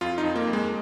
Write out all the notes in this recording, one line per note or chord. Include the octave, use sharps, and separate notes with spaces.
F2 F4
D#4
F2
A#3
F2
G#3